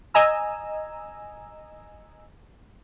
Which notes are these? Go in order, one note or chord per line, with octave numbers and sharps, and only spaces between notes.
D#5 G#5 A#5 E6